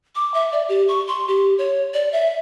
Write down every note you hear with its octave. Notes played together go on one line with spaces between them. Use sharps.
D6
E5
D5
G4
C#6
C6
G4
C#5
D5
E5